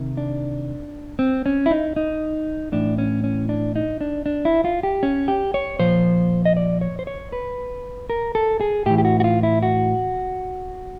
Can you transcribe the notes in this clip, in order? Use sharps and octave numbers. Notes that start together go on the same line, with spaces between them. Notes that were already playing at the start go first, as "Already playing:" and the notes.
Already playing: C3 D#3
D4
C4
C#4
E4
D#4
D#4
A2 E3 D4
C#4
C#4
D4
D#4
D4
D4
E4
F4
G4
C#4
G4
C#5
A#2 F3 C5
D#5
D5
C#5
C5
C#5
B4
A#4
A4
G#4
A2 E3 G4
G4
F#4
F#4
F4
E4
F#4